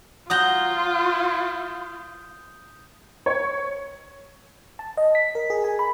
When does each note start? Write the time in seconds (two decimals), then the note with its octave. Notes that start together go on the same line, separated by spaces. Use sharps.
0.30 F#3 F4 F#4 A#5 D#6 G6 G7
3.26 C#5
4.79 A5
4.97 D#5
5.15 B6
5.35 A#4
5.50 G#4
5.64 G#5
5.79 B5